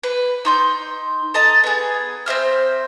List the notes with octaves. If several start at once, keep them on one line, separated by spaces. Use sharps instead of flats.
B4
D#4 C6 G6
A4 D#5 A5 A#5
B3 G#4
C4 C5 E5 F6